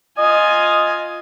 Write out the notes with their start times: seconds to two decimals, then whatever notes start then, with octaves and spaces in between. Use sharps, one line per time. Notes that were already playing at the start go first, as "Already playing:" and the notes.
0.18 F4 D#5 G#5